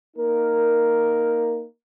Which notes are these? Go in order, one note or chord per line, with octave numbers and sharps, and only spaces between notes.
A#3 D#4 A#4